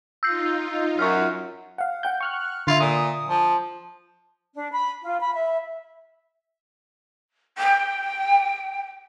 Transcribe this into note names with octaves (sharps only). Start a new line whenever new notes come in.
D#4 F4 E6 G6 C7
F#2 C#6 F6
F5 F#5
F#5 G5 G6
C#6 F6 F#6
D3 F4 E5
A#2 D#6
F3
D4
B5
F4
B5
E5
G5